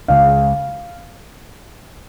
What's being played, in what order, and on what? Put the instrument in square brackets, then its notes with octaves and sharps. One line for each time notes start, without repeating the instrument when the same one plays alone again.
[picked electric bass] C#2 C#3 G#3 [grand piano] F5